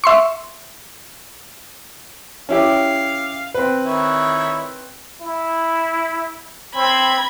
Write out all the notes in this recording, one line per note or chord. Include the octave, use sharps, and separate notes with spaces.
E5 C6 C#6
C#4 E4 G4 F5
C4 B4
D#3 E4 C#5
E4
C4 B5 G#6